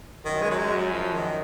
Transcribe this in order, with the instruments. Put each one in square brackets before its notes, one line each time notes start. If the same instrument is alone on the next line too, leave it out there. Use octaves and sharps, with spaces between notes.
[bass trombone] F#2 [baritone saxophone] D#3
[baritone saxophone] G#3
F#3
G#3
F#3
F3
D#3